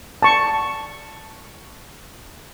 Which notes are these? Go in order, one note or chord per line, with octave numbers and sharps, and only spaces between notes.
A5 C#6